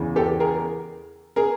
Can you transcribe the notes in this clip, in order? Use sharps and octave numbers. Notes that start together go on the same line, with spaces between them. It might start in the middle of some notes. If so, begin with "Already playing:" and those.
Already playing: E2 C#3 E3
G4 A4
G#4 A#4
G#4 A#4